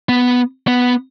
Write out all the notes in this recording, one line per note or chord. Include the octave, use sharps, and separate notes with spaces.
B3
B3